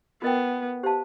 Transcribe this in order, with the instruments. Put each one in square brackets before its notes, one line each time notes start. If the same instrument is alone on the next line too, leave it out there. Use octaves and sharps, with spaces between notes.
[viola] B3 [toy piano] F4 A#4 D#5 G5
[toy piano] G4 C5 F5 A5